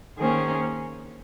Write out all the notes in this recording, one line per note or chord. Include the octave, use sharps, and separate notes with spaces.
D#3 A#3 C#4 G#4 C5